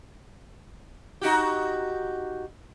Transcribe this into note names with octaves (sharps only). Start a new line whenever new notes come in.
D#4 F#4 G4